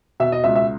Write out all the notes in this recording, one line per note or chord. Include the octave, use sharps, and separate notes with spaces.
B2 E5
D#5
C#2 E5
E5